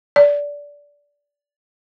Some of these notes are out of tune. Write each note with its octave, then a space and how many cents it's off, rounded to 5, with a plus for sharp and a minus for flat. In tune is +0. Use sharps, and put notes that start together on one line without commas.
D5 -15